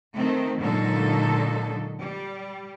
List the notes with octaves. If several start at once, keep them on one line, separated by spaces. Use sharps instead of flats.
D#3 A3 C4 D#4
A#2 D3 F#3 G#3 D#4 A4
G3